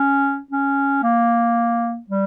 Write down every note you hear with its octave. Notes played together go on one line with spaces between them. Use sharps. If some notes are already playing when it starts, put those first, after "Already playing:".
Already playing: C#4
C#4
A#3
G3